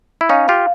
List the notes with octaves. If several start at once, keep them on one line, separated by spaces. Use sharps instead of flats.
E4
C#4 D#4 F5
F4 G4 F5